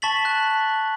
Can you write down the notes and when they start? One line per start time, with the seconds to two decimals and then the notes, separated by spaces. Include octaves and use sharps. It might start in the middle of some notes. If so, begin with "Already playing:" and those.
0.02 A5 C#6 A6 B6 F#7
0.25 F#6 F#7